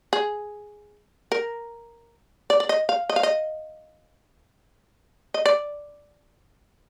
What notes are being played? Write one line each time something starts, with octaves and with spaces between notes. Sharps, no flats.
G#4
A#4
D5
D5
D#5
F5
D#5
F5
D#5
D#5
D5